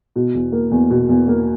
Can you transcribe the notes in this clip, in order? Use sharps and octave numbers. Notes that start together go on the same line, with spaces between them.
B2
E2
A#3
E2
B2
E2
A#3